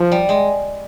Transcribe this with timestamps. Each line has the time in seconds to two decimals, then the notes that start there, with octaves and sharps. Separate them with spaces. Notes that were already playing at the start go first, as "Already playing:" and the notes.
Already playing: F3
0.12 G3
0.29 G#3